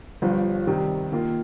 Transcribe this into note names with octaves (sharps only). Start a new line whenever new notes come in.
G1 G2 F3
C3 D#3 G3
D#3 A#3 F4